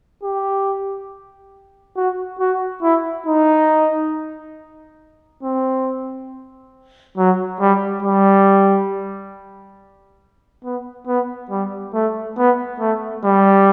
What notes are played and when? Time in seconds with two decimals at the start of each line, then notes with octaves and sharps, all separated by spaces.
0.23 G4
1.96 F#4
2.40 F#4
2.82 E4
3.27 D#4
5.43 C4
7.17 F#3
7.60 G3
8.03 G3
10.64 B3
11.07 B3
11.50 G3
11.94 A3
12.38 B3
12.80 A3
13.24 G3